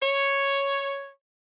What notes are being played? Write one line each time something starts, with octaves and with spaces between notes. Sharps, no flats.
C#5